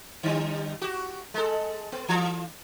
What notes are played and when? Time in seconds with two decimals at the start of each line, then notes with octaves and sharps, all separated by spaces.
0.23 D3 G3
0.81 F#4 G4
1.34 G#3 A4
1.92 B3
2.08 E3 F4